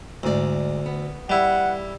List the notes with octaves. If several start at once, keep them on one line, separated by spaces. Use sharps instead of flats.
D2 G#2 D5
B3
G3 E4 F#5